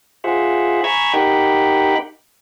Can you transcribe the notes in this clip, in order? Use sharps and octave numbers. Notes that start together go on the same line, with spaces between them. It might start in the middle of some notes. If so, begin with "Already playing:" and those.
F4 G#4 C5 E5 F#5
G#5 A#5 B5 C#6 E6 G#6
D#4 G4 A#4 F#5 G5 B5